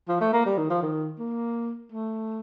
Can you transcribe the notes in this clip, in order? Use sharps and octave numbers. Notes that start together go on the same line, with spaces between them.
F3
A3
A#3
G3
D#3
F3
D#3
A#3
A3